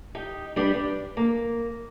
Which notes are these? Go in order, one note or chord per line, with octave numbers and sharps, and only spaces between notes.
D#4 G4
G3 D4 G4 B4
D4
A#3